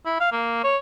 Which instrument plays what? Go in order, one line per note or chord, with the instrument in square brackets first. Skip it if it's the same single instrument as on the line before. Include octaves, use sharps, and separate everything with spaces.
[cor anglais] E4
F5
A#3
C#5